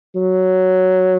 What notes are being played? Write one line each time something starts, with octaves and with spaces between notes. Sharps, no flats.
F#3